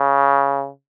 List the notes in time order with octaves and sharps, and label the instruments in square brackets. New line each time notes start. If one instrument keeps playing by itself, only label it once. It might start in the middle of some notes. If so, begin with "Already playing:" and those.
Already playing: [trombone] C#3